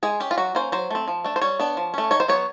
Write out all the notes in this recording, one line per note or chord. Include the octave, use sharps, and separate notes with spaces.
G#3 G#4
C#4 G4
F4
F#3 F#4
A#3 C#4 C5
F#3 C5
A3 C4
F3
A3 D4
C5
G3 C#5
B3 D4
F3
A3 C#4
D#3 C#5
C5
F#3 B3 C#5